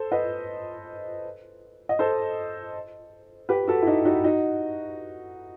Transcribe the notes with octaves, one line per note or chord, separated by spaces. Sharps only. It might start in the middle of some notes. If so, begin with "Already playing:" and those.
Already playing: A4 C5
B4 D#5
D#5
A4 C5
G4 B4
F#4 A4
E4
D#4 F#4
D#4 F#4
D#4 F#4